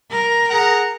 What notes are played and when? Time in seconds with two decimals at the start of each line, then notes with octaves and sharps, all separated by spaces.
0.10 A#4
0.50 G#4 F#5 A#5